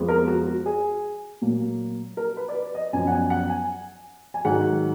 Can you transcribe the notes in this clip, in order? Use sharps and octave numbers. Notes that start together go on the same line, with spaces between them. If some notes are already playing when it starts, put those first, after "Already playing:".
Already playing: F2 F3 G#3 B3
A#4
F#4
F#4
G#4
A#2 F#3 A#3
A#4
B4
D5
B4
D#5
F#2 F3 B3 G#5
F#5
G#5
F#5
G#5
G#5
G#2 D#3 F#3 F#5